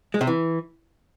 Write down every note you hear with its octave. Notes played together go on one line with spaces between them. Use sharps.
G#3
C3
E3